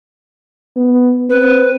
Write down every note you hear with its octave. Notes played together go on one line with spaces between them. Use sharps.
B3
C4 B4